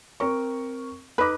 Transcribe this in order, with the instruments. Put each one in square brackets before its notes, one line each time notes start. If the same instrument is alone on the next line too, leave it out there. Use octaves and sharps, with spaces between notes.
[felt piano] C4 A#4 C#6
[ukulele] D#4 B4 [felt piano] B5 D6